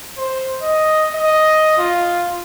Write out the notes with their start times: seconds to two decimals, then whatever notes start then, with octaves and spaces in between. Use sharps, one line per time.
0.17 C5
0.61 D#5
1.14 D#5
1.77 F4